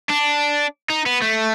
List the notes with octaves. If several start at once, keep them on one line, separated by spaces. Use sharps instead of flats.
D4
D#4
B3
A3